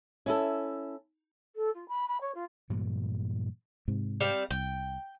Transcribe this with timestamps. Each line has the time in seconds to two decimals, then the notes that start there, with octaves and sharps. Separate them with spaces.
0.26 C#4 E4 A4
1.55 A4
1.74 F4
1.88 B5
2.07 B5
2.20 C#5
2.34 F4
2.70 G2 A#2 E3 F#3
3.88 G#2 C3
4.20 G3 C4 F5
4.51 C2 G5